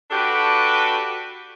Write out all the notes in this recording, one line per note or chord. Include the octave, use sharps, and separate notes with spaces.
D4 F#4 G4 A4 B4